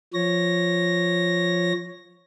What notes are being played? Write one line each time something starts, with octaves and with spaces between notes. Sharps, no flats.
F3 C#5 A#6